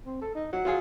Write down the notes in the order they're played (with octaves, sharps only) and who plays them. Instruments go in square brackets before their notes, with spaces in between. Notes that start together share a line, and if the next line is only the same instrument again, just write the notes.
[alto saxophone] C4
A4
D#4
[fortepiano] F#3 [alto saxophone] F#5
[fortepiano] F#3 F4 G#4